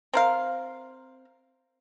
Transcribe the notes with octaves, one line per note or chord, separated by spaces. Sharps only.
C4 A#4 F5